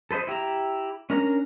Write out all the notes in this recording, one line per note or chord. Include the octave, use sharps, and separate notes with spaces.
A4 B4 C5 D#5
E4 G4 E5 A#5
C#4 D4 A#4 A#5